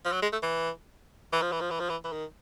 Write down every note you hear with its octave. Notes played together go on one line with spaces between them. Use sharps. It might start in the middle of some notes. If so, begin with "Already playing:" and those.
F3
F#3
G#3
A3
E3
E3
F3
E3
F3
E3
F3
E3
E3
D#3